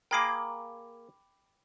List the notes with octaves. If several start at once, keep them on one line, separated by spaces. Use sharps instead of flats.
A#3 G#4 A#4 G5 B5 D6